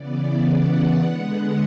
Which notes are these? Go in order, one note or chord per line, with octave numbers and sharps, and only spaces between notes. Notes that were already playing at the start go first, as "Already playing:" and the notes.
Already playing: C#3 E3 B3 D5
F#5
D3 G#3 B3 F#5